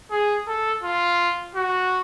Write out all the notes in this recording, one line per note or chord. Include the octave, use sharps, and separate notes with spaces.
G#4
A4
F4
F#4